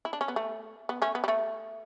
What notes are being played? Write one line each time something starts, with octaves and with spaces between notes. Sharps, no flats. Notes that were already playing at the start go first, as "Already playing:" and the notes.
E4
D4
C#4
B3
A3
B3
A3 C#4
B3
G3
A3